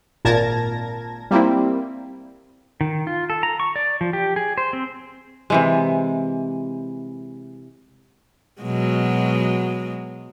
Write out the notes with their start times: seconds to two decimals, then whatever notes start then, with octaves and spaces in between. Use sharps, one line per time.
0.25 G#1 A#2 A#4 A5 G#6 A#6
1.31 G3 A#3 C4 E4
2.81 D#3
3.07 F4
3.30 A4
3.43 A#5
3.60 C#6
3.76 D5
4.01 F3
4.13 G4
4.36 G#4
4.58 C5
4.73 C4
5.50 C3 E3 G#3
8.62 B2 F#3 G#3